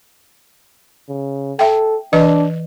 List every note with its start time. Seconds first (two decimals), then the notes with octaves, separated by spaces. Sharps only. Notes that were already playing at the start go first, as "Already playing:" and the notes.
1.09 C#3
1.59 A4 E5 G5
2.13 E3 D4 B4 D#5